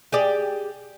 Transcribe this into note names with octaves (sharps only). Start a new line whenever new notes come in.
G4 G#4 D5